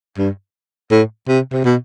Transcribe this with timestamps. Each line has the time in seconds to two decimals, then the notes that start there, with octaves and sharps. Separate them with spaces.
0.18 G2
0.91 A2
1.28 C3
1.52 C3
1.64 B2